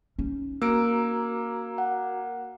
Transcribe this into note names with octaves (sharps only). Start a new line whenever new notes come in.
C#4 D#4
A#3 F#4 A#4 A#5 E6 D7
F#5